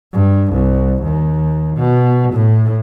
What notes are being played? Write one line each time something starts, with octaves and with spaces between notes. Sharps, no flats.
G2
C2
D#2
B2
A2